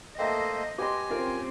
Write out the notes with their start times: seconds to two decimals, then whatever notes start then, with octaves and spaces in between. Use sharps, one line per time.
0.18 A3 A#3 A4 C5 D#5 E5 G5
0.78 G4 B4 G#5 C6
1.10 C4 C#4 F4 A#4